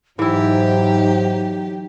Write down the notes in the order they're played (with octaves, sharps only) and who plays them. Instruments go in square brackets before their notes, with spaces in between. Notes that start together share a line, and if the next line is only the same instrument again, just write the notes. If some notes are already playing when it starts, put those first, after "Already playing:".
[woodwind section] G#2 [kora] E3 E4 [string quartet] F#3 G4 [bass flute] D#4